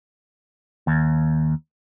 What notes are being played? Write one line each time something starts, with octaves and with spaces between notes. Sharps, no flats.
D#2